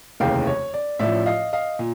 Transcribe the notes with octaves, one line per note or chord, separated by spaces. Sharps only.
F1 D#2 C#3 E3 F5 G5
C#5
D5
A1 A2 F3 D5 E5
D#5 F5
D#5 F5
A#2